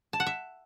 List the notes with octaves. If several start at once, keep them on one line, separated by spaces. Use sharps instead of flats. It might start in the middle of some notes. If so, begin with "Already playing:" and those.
A5
F#5
E5